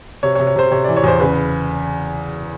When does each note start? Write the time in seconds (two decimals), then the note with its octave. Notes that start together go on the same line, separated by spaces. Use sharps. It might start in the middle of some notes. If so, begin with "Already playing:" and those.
0.23 C3 C#5
0.35 C#5
0.39 C3
0.47 C#5
0.56 C3 C5
0.71 C3 C#5
0.84 E3 D5
0.96 C#5
1.04 E2 C5
1.20 C#3 B4